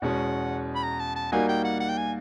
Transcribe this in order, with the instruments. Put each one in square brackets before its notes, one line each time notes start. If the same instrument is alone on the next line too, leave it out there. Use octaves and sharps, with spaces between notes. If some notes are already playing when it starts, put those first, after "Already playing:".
[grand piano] E2 B2 G#3 C#4 [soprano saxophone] F#5
[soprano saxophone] B5
A#5
A5
A5
[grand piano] G3 A#3 D#4 F#4 [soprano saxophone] G#5
[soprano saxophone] G5
F#5
F#5
G5
G#5